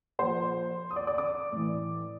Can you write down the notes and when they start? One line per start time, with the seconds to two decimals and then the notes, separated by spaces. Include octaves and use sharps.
0.19 A#2 F3 C5 C6
0.91 D#6
0.96 D5 D6
1.07 D5 D6
1.18 D5 D6
1.52 A2 E3